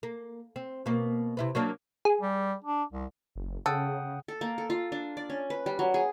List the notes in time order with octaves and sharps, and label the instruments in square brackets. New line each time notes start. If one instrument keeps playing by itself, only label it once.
[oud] A#3
C4
B2 A#3
C3 E4 B4
F#3 A#3 D4
[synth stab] G#4
[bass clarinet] G3
D4
C2
[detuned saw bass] F#1
[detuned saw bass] C#3 [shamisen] A4 [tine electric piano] F#5 G5 D#6
[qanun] A4
A#3
A4
F4
D4
D5
C#4
B4
G3
F#3
G#4